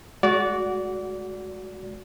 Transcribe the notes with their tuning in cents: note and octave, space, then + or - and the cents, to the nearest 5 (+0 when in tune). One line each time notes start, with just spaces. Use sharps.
G#3 +20 F#4 +0 D5 -25